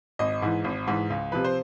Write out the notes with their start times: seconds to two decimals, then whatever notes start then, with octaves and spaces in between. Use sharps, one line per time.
0.19 G#1 D#5
0.42 G#2 E3
0.64 G#1
0.87 G#2 E3
1.10 C#2
1.32 C3 F3 B4
1.44 C5